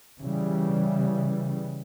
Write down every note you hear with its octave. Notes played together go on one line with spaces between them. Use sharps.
C#3 E3 G3